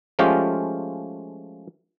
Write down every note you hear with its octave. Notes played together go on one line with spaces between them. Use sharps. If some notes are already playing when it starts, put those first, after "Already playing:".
F3 G#3 A3 C#4 F4 G4